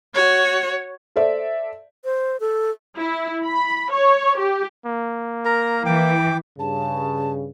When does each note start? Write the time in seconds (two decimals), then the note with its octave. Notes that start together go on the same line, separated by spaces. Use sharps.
0.14 F#4 C#5
1.16 A4 C5 D5 E5
2.05 C5
2.40 A4
2.97 E4
3.45 B5
3.91 C#5
4.38 G4
4.86 A#3
5.45 A#4 A#5
5.86 E3 G5 D6
6.59 G2 C#3 A5